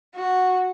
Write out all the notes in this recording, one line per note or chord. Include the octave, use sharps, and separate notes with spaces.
F#4